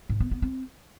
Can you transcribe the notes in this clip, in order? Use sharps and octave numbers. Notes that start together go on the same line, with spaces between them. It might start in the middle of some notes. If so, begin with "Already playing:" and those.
G#2
B3
B3
C4